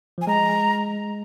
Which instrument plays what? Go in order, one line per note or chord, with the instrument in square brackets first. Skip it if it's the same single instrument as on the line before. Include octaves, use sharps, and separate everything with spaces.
[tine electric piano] F3 [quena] G#5
[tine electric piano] G#3 [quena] A#5